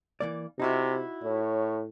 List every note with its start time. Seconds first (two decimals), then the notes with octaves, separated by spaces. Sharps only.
0.20 E3 A#3 D5
0.60 C3 D#4 E4 F#4
1.24 A2 C#5